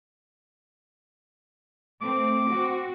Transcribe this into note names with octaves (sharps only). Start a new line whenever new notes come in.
A3 C4 D6
C4 F#4